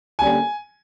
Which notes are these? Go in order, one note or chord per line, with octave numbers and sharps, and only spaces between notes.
D3 G3 A#3 C#4 G#5